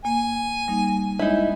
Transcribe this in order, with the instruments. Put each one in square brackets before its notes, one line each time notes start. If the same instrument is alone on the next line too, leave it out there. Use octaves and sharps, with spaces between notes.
[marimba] A#3 [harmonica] G#5
[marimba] G3 A#3 D#4
[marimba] G#3 [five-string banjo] D#4 E4